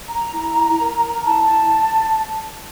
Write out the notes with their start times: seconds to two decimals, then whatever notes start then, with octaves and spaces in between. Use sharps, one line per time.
0.09 A#5
0.33 E4
0.80 A#4
1.25 E4 A5